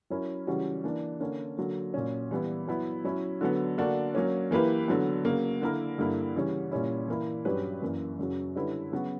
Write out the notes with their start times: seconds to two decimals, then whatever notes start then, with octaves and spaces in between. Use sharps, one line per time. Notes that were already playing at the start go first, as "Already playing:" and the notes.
0.10 F#3 C#4 E4 A#4
0.47 C#3 E3 G3 C#4 F#4
0.84 E3 A#3 D4
1.20 D3 A#3 C#4
1.57 D3 F#3 A#3
1.94 A#2 F#3 C#4
2.31 E3 G3 B3 E4
2.67 F#3 B3 E4
3.04 F#3 C#4 E4
3.41 D3 F#3 B3
3.78 D3 A#3 D4 F#4
4.15 F#3 A#3 C#4
4.51 E3 A#3 E4 G4 B4
4.88 D3 F#3 B3
5.25 C#3 F#3 A#3
5.62 D3 A#3 E4 A#4
5.98 G2 D3 A#3 E4
6.35 C#3 E3 G3 C#4
6.71 A#2 G3 C#4 E4
7.08 E3 A#3 E4
7.45 G2 F#3 C#4 G4 B4
7.82 F#2 E3 A#3
8.19 F#2 C#3 F#3
8.56 D3 G3 C#4 E4 B4
8.92 C#3 F#3 B3 F#4